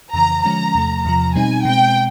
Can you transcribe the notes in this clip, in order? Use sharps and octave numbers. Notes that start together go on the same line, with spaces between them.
F2 C#3 E3 A#5
D3 F3 G#3 C#4 A#5
E2 C3 F3 A3
E2 C3 F3 A#5
B2 G3 C4 D#4 G#5
B2 G#3 C4 G5